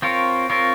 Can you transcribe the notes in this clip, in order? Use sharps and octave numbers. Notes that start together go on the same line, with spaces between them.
C4 F4 A#4 C#5
C4 F4 A#4 C#5